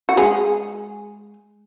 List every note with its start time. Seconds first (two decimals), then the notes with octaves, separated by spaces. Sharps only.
0.09 F#4
0.17 G#3 G#4